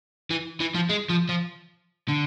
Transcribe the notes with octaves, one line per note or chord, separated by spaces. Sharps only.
E3
E3
F3
G#3
F3
F3
D3